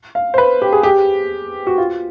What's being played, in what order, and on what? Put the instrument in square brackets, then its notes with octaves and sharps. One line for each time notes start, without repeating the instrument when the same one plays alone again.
[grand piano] F5
C5
B4
G4
G#4
G4
F#4
F4